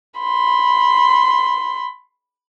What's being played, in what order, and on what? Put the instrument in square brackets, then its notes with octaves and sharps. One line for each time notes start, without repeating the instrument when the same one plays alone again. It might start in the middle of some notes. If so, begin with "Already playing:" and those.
[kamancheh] B5 C6